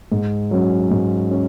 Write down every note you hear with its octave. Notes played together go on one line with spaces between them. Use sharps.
G#2
F#3 C#4
G#2
C#4